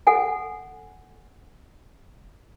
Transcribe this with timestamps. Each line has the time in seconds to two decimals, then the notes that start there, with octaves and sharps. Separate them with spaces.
0.07 A4 F#5 G#5